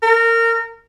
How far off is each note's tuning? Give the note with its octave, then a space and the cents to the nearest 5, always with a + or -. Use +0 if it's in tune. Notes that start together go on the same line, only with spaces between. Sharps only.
A#4 -20